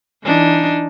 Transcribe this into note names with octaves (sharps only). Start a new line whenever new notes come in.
E3 D4 D#4